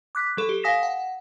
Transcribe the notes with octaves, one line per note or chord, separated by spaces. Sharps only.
D6 F#6 B6
F#3 A4
G4
F5 G#5 D#6 A#6 B6 E7
F#5